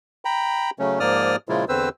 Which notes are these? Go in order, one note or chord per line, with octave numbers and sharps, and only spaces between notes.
G5 A#5 B5
C#3 F#3 A3 C#4
G#2 F3 A#3 D5 D#6 F6
A#2 C#3 F3 G#3 E4 F4
E2 D3 C4 B4 C5 E6